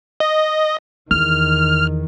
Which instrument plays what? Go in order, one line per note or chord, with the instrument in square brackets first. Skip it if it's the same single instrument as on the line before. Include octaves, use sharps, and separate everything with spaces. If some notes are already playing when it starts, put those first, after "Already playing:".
[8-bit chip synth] D#5
[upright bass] E2 [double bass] D#3 [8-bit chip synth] F6